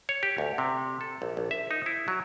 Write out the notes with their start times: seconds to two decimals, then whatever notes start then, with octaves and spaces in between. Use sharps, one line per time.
0.09 C#5
0.23 G4
0.38 D2
0.58 C3
1.01 A4
1.22 A#1
1.37 A#1
1.51 E5
1.71 D#4
1.86 E4
2.08 F#3